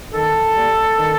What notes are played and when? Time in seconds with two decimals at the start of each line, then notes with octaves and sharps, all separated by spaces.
0.12 D#3 A4
0.55 G3 A#3
0.97 D#3